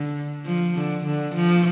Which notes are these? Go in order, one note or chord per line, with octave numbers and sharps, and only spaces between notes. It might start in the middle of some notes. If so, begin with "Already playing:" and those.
Already playing: D3
F3
D3
D3
F3